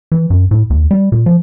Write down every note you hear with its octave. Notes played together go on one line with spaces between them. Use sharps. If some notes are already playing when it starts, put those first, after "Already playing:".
E3
F#2
A2
D#2
G3
A#2
F3